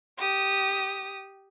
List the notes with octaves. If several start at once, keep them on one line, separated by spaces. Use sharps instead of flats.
G4 D#6